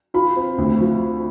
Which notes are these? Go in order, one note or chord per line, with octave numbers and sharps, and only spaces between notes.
F4 B5
C4
D2
F3